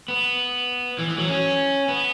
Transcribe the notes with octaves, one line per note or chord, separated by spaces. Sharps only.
B3
E3
E3
F#3
C#4
B3